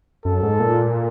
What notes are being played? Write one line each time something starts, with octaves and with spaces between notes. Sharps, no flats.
F#2 A4
G#2
A#2